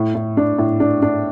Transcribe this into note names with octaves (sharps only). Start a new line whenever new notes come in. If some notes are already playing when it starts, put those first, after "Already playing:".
Already playing: A2
A2
D4
A2
D4
D4